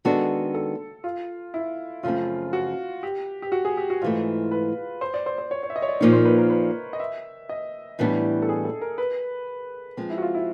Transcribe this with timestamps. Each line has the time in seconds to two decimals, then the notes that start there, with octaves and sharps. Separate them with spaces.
0.05 D#3 G#3 B3 D4 F#4 A4
0.54 A4
1.04 F4
1.54 E4
2.03 F#2 C#3 F3 A3 C4 F4
2.53 F#4
3.03 G4
3.42 G4
3.52 F#4
3.65 G#4
3.77 G4
3.90 F#4
4.02 G#2 E3 A3 F4
4.52 B4
5.01 C5
5.14 D5
5.26 C5
5.38 C5
5.51 C#5
5.63 C#5
5.70 E5
5.76 D#5
5.82 C#5
5.88 D5
6.00 A#2 F3 A#3 D#4 C#5
6.13 C5
6.25 B4
6.38 A#4
6.50 B4
6.93 D#5
7.00 E5
7.49 D#5
7.99 A2 E3 G3 B3 D4
8.42 A4
8.49 G#4
8.65 A4
8.81 A#4
8.98 B4
9.97 F3 G#3 C4
10.10 E4
10.18 F#4
10.22 F4
10.34 E4